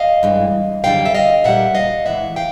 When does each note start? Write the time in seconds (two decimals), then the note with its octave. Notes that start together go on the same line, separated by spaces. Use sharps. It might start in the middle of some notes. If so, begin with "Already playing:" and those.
Already playing: D#5 F5
0.23 G2 E3 G#3
0.84 F#2 D3 G3 F5 G5
1.05 E5
1.15 D#5 F5
1.44 A#2 G3 E5 F#5
1.75 D#5 F5
2.05 A2 E3 G#3 E5 F#5
2.36 F5 G5